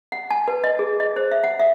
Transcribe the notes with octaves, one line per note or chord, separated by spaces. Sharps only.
F#5
G#5
B4
D#5
G#4
D#5
C5
E5
F#5
E5